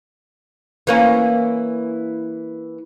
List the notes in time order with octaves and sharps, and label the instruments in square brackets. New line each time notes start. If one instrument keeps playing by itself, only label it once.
[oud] E3 A#3 C#4